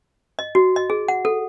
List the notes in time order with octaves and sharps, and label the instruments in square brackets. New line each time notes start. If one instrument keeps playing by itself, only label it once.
[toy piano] D#5
F#4
D#5
G#4
F#5
A4